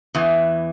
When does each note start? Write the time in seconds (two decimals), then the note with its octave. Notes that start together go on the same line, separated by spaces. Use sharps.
0.15 E2 E3